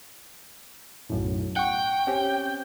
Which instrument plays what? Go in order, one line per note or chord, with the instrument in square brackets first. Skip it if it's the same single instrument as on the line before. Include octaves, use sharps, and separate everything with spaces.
[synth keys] B1 F#2 A2
[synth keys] F#5 C#6 [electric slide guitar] G5
[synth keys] C4 C#4 G4